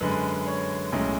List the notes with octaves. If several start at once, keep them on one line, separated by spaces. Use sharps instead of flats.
F#2 D3 G#3 B4
C#5
B1 A2 G#3 C#4